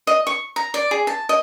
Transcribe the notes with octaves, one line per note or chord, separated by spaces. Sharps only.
D#5
C#6
A#5
D5
G#4
A5
D#5